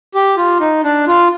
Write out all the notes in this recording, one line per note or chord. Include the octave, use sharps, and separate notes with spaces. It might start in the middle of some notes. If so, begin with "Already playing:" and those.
G4
F4
D#4
D4
F4